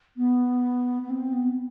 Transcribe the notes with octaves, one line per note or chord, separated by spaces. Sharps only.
B3
B3
C4
B3